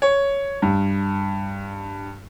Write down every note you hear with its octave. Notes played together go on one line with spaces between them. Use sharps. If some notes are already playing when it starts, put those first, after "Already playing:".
C#5
G2